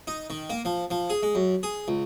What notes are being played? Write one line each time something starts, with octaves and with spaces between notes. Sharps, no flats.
D#4
D#3
A#3
F3
F3
G#4
G#3
F#2
G#4
C#2